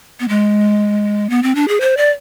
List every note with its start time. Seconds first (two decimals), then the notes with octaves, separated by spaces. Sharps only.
0.20 B3
0.29 G#3
1.30 B3
1.43 C4
1.55 D4
1.68 G#4
1.81 C5
1.97 D5